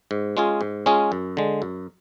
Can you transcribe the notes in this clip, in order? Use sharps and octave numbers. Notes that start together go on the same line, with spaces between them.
G#2
G#3 C#4 F4 G#4
G#2
G#3 C#4 F4 G#4
F#2
D3 G#3
F#2